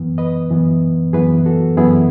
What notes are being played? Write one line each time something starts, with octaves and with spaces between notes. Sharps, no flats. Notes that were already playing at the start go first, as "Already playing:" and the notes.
Already playing: F#2 E3 B3
B4 D#5
F#2 E3 B3
F#2 E3 B3 G#4 B4
F#4 A4
F#2 E3 B3 E4 G#4